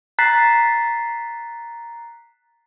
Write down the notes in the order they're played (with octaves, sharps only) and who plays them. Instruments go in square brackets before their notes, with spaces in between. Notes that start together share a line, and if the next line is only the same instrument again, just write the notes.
[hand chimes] A#5 F#6 A6 B6 C7